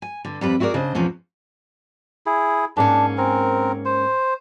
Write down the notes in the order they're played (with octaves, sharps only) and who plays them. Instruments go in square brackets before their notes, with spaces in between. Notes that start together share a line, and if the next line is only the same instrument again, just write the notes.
[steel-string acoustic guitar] G#5
G2 D3
F2 G3 B4
E4 F#4 G#4 A#4 D5
C#3 D4 C5 D#5
E2 B2 F3 C#4
[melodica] E4 G#4
[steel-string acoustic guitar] G#2 A#3 C#4 [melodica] D4
[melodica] C4 A#4
C5